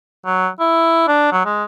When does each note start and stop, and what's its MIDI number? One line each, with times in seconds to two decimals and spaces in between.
0.26 0.48 54
0.60 1.06 64
1.08 1.29 62
1.32 1.41 54
1.45 1.64 56